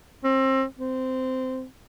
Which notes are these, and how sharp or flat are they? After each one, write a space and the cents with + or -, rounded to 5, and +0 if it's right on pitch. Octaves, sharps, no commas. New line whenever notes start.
C4 +30
C4 -15